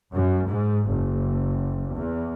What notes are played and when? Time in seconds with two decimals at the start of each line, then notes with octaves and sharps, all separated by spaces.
0.12 F#2
0.47 G#2
0.88 F#1
1.93 E2